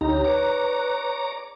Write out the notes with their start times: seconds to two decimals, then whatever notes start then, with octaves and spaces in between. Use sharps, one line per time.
0.01 D2 C#3 D#4 G4 A#5
0.24 B4 C#5 D5 A#5 D6